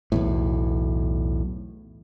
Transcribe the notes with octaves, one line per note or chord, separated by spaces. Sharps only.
B1 E2 A2